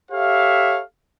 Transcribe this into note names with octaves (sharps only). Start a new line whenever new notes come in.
G4 A4 C#5 E5 F5